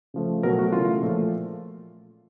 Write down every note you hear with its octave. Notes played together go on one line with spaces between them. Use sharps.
C#3 F3 A3
B2 F#3 A3 A#4
F#4
C#3 E3 A3 F4
A#2 F3 A3